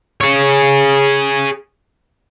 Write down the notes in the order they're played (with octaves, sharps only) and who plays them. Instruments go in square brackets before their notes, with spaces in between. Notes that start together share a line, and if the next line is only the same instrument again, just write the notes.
[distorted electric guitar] G#4 C#5